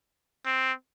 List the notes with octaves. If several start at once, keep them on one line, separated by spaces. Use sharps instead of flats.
C4